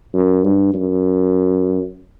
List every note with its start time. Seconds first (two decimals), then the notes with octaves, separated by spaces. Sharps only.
0.14 F#2
0.44 G2
0.74 F#2